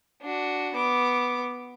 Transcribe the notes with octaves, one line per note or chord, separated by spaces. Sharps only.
D4 F#4
B3 D6